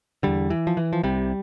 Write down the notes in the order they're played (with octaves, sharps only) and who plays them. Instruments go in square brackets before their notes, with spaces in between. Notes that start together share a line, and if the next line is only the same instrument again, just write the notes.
[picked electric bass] E2 D3 G3
E3
F3
E3
F3
C2 C3 G3